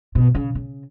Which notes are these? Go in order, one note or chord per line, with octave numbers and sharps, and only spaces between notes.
B2
C#3
C#3